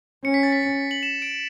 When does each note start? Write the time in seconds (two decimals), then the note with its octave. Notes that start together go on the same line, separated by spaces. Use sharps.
0.24 C#4 C#7
0.34 B6
0.43 A6
0.52 B6
0.63 C#7
0.91 F#7
1.03 E7
1.22 D7